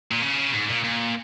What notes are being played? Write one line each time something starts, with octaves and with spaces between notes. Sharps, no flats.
A#2
C#3
G#2
A#2
A#2